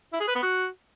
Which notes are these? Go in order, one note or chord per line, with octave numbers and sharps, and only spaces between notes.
E4
G#4
B4
B3
F#4